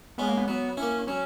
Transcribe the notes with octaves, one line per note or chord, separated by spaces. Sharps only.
G#3 B3 C#4
A#3
B3
F#3 B3
A#3 C#4 E4
F#3 C#4